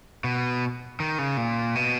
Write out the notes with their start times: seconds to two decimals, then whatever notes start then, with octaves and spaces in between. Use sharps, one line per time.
0.24 B2
1.00 D#3
1.19 C#3
1.37 A#2
1.75 B2